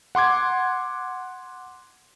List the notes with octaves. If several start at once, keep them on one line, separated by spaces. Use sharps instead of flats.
F#5 C6 D6 G#6